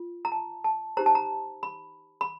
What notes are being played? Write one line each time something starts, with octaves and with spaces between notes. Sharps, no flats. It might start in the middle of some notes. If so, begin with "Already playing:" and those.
Already playing: F4
A#5
A5
A5
D#4 G4 C5 A#5
A5
A#5
B5
B5